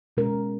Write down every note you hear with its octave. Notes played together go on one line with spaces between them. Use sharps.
B2 G#3 C#4 A#4